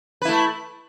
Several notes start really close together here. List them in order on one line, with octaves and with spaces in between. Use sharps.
B4 E4 A3